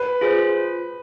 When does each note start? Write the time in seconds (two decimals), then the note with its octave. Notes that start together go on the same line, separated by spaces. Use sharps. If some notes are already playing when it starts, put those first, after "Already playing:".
Already playing: B4
0.21 F4 G#4 C5